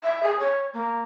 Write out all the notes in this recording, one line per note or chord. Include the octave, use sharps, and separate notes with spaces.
E5
G#4
C#5
A#3